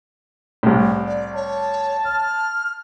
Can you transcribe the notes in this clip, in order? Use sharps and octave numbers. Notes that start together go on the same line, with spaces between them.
C2 A2
D5
C#5 A5
F6